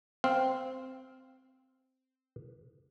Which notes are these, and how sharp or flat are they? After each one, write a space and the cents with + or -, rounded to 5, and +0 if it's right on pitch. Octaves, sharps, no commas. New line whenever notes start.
C4 -5 F5 +0